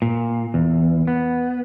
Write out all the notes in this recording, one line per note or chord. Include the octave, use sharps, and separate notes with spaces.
A#2
E2
B3